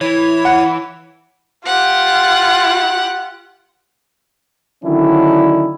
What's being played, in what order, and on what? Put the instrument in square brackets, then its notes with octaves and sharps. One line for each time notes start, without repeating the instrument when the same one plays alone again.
[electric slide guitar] E3 [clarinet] E4 [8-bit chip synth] C#5
[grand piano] F#5
[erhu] F4 [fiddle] G4 F#5
[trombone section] D3 D#3 F#3 C#4 D4 E4